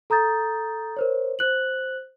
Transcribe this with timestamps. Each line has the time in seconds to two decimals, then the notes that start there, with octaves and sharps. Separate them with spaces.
0.10 A4 A#5 D#6 G6 A6
0.97 A#4 C5 C#5
1.39 C5 F#6 F#7